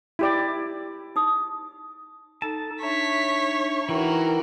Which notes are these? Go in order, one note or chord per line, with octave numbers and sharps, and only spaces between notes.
E4 G4 D5
D#4 D#6
D#4 A4 A5
D4 D#4 C#5 E5 B6
E3 D#4 E4 F#4 A#4 G5